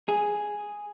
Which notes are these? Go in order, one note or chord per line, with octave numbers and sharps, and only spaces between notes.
G#4